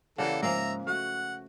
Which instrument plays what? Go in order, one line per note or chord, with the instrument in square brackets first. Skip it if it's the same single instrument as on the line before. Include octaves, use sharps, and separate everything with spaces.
[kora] C#3 A#3 G4 [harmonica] E3 A4 [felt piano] D5 F#5
[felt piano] G#2 [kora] F3 G#3 A#3 [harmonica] E5 A#5
[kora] A3 [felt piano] F#4 [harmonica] F#5